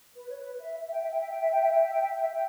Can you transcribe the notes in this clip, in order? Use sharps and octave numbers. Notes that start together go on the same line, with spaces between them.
B4
C#5
B4
E5
E5
G5
E5
G5
E5
G5
E5
G5
E5
G5
E5
G5
E5
G5
E5
G5